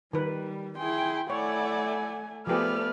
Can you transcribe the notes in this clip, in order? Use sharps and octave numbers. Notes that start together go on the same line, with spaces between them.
D#3 G3 B4
E4 G#4 G5 C6
A3 E4 C#5 D5 F#5 G#5
F3 A3 B3 G4 G#4 B4 D5 F6